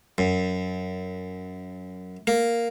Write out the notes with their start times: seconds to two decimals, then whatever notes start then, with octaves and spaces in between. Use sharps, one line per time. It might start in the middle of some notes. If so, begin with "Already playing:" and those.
0.18 F#2
2.27 A#3